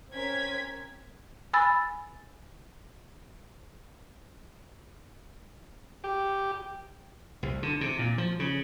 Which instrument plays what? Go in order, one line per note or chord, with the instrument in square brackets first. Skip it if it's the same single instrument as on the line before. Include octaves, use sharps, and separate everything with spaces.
[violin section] C4 C#4 A#4 G#6 B6
[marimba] G#5 B5 E6 A6
[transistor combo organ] G4
[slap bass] C2
D3
C3
A#2
F3
C#3